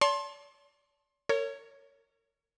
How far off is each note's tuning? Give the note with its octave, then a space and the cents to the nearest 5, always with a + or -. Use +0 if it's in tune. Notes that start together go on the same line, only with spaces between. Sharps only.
D5 -45 A5 +0 C6 +25
A#4 -35 C#5 +0